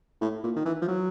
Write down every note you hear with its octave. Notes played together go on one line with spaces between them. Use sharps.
A2
A#2
D#3
E3
F3
F#3